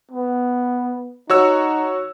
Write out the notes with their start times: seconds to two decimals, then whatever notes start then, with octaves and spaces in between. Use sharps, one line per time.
0.11 B3
1.30 D#4 F#4 C#5 E6